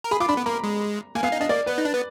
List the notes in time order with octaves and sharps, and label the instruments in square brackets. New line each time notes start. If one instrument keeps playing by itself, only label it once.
[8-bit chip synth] A#4
[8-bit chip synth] G#4 [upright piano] B5
[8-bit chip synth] F4 [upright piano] D6
[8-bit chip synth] D4 [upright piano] B5
[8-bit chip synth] B3
[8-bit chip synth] A#3 [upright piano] A#5
[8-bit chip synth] G#3
[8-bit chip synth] A#3 [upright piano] G#5
[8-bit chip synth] B3 [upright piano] F5
[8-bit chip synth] D#4
[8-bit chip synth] D4 [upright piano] D#5
[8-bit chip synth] A#3 [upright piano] D5
[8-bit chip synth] B3 [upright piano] B4
[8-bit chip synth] D#4
D4
B3